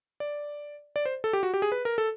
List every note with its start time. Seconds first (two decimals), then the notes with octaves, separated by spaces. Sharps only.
0.20 D5
0.96 D5
1.06 C5
1.24 A4
1.33 G4
1.43 F#4
1.54 G4
1.62 G#4
1.72 B4
1.85 A#4
1.98 A4